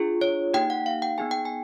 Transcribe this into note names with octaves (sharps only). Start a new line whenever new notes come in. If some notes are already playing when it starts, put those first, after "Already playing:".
Already playing: D4 F4 G#4
C#5
A#3 D#4 G4 G5
F#5
F5
G5
B3 D#4 G#4 G#5
G5
G#5